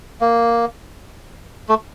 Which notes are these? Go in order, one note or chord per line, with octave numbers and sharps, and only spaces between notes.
A#3
A3